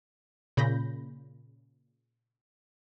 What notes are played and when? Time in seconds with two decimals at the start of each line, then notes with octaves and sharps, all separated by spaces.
0.57 A#2 C#3 B5 G6 A#6